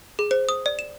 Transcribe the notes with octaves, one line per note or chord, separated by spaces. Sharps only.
G#4
C5
D#6
D5
E7